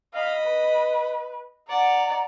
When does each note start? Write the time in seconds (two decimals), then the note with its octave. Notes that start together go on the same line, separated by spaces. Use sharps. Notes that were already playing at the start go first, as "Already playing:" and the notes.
0.14 D#5 F5 B5
0.45 B4
1.70 D5 F#5 A#5